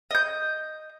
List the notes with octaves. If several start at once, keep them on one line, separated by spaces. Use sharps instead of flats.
D#5 G6